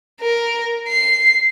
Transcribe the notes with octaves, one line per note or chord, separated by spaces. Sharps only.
A#4
C7